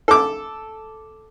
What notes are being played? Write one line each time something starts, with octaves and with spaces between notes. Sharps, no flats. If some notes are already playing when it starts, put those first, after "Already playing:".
A4 D6